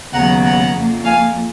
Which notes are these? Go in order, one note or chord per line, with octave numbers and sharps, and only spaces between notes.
D#2 C#3 F#3 B3 F#5 A#5
F#5 A#5
F2 F3 A#3
F5 G#5